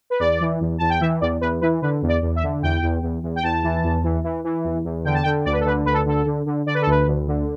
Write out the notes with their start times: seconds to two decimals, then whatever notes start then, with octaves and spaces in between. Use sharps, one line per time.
0.10 B4
0.19 E2 D5
0.40 E3
0.60 E2
0.78 E2 A5
0.89 G5
1.01 E3 E5
1.21 E2 D5
1.41 E2 B4
1.61 E3 B4
1.82 D3 B4
2.02 E2
2.08 D5
2.22 E2
2.36 E5
2.43 D3
2.63 E2 G5
2.82 E2
3.03 E2
3.23 E2
3.36 G5
3.43 E2 A5
3.63 E3
3.84 E2
4.04 E3
4.24 E3
4.44 E3
4.64 E2
4.85 E2
5.05 D3 G5
5.14 A5
5.23 D3 G5
5.45 D2 D5
5.52 B4
5.60 A4
5.65 D3 B4
5.86 D2 B4
5.93 A4
6.06 D3 A4
6.26 D3
6.46 D3
6.66 D3 D5
6.74 B4
6.82 A4
6.86 D2 B4
7.07 D2
7.27 D3